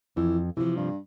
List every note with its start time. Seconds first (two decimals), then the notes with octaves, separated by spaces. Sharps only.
0.16 F2 E3
0.57 C3 E3 F3
0.76 G2